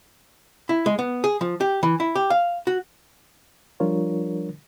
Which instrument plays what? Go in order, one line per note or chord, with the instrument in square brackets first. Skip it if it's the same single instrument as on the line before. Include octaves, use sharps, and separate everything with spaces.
[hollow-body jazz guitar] E4
G#3
B3
G#4
F3
G4
E3
E4
G4
F5
F#4
[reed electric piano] F3 G3 D4 F4 A#4 C#5